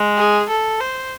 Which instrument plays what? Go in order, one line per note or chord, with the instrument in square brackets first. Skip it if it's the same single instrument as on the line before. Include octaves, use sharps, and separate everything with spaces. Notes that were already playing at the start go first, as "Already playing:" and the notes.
Already playing: [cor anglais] G#3
[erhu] G#4
A4
C5